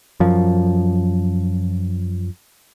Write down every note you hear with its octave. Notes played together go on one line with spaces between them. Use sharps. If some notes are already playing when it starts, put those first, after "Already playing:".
F#2 F3